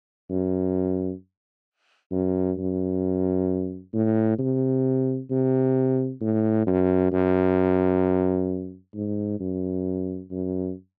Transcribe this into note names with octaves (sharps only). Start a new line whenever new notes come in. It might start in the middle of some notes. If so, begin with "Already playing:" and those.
F#2
F#2
F#2
A2
C3
C3
A2
F#2
F#2
G#2
F#2
F#2